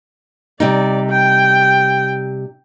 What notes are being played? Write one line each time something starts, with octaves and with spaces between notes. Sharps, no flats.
C3 G3 D#4 D5
G5